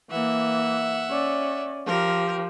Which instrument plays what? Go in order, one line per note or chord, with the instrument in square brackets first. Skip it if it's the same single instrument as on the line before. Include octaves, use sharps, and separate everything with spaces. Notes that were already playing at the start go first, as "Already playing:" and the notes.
[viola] E3 A#3 [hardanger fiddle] E5 F#5
[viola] C#4 D5
[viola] F3 G4 [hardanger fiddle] A#4